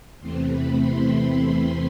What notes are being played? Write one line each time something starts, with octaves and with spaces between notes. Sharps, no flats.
E2 C3 E3 A3 C4 C6
B5
C6